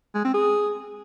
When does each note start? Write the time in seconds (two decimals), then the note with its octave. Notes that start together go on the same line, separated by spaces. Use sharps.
0.15 G#3
0.25 C4
0.34 G#4